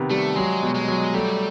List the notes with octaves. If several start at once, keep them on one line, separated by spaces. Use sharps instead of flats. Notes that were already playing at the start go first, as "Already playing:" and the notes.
Already playing: C3 D#3 B3
G3 A3
F#3 G#3
B2
G#3
F#3
G3 A3